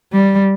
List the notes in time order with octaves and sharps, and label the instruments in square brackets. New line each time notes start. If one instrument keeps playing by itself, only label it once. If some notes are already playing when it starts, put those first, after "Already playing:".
[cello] G3